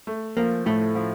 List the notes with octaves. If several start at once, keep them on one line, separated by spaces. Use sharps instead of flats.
A3
F3 A#3
A2 A3
F3